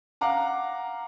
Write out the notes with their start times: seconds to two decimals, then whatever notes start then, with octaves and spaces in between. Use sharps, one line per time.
0.21 F5 F#5 A#5 D6